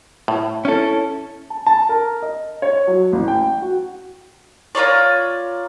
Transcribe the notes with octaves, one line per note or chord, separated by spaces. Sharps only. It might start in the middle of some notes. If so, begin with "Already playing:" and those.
A2
C#4 E4 A4
A5
A5
A#4
D#5
C#5
F#3
A1
G5
F#4
F4 A#4 C#5 D5